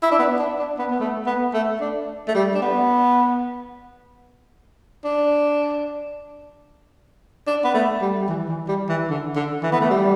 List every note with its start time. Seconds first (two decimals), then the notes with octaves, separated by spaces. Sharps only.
0.03 E4
0.11 D4
0.19 B3
0.39 D4
0.59 D4
0.79 B3
0.91 B3
1.00 A3
1.26 B3
1.54 A3
1.81 D4
2.28 A3
2.35 G3
2.54 D4
2.62 B3
5.04 D4
7.47 D4
7.64 B3
7.74 A3
8.01 G3
8.22 G3
8.29 E3
8.49 E3
8.68 G3
8.89 E3
9.10 D3
9.36 D3
9.63 E3
9.72 B3
9.81 A3
9.90 G3